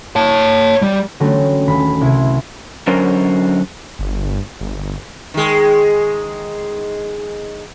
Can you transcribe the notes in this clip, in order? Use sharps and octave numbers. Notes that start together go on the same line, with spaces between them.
C#5 A5
G3
D3 F#3 G3 A3 C#4
D#1 B5
C2 E4 G#6
D3 F#3 C#4 A#4 C5
G1
G1
D#3 G#3